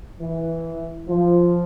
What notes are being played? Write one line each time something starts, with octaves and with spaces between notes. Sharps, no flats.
E3
F3